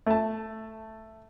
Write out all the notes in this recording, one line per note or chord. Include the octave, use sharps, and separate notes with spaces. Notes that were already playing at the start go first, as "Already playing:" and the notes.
A3 A5